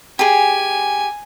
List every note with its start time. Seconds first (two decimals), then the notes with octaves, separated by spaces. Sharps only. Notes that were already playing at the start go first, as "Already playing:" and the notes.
0.19 G4 G#4 G#5